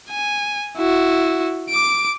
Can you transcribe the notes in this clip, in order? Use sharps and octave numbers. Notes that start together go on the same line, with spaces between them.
G#5
E4 F#4
D6 D7